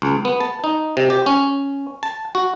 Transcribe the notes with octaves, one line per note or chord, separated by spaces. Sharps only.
C#2
B3
A5
D#4
C3
G4
C#4
A5
F#4